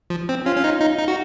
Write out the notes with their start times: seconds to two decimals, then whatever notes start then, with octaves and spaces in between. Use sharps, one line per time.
0.10 F3
0.29 C4
0.46 C#4 F4
0.57 C#4
0.64 D#4
0.81 D#4
0.99 D#4
1.08 F#4